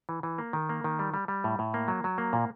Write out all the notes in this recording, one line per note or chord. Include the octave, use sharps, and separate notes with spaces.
E3
E3
A#3
D#3
A#3
D#3
G3
G3
G3
A2
A2
A#3
F#3
F#3
A#3
A#2